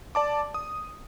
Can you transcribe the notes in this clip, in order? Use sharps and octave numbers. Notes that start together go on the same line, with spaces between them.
D5 A5 D6
D#6